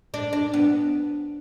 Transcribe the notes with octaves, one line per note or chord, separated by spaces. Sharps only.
D4
D4
B3